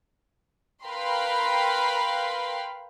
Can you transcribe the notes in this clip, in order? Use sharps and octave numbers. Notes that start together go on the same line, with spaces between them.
A#4 B4 F5 G5 B5 C6